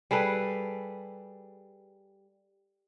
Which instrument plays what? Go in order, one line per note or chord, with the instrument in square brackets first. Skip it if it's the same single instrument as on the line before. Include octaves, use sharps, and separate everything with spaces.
[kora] G3 G#4 A4 B4